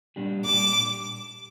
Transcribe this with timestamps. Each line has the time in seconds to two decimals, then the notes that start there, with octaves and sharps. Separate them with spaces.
0.16 A#2 G3 D4 G4
0.45 A#2 G3 D4 G4 D6